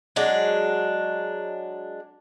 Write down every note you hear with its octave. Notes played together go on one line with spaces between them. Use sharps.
F#3 G#3 D4 F#4